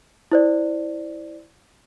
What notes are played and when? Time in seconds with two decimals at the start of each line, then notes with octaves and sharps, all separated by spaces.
0.32 E4 C5 D5